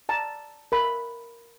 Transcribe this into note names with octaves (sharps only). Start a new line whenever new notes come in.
D5 A5 A#5
A#4 B5